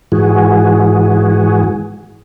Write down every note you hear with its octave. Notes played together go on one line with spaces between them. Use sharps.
G#2 E3 F#4 G#4